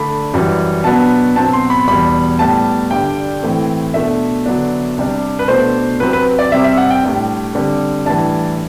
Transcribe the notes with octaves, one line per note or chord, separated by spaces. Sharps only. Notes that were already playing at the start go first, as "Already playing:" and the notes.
Already playing: D3 A3 D4 B5
F#2 E3 G3
B2 F#3 B3 D4 A5
B2 F#3 C4 A5
C6
B5
E2 B2 G3 B5
A2 G3 B3 A5
G2 D3 G3 G5
A2 E3 A3 C4
B2 A3 D4 E5
D3 F#3 B3 D4
C3 G3 D4
B4
B2 A3 D4 C5
C3 F#3 C4 B4
B4
D5
C3 G3 C4 E5
E5
F#5
G5
A2 G3 D4
D3 G3 C4
A2 E3 G3 D4 A5